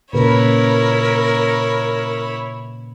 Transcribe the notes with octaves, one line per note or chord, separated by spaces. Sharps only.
A#2 C#3 E4 A#4 B4 C#5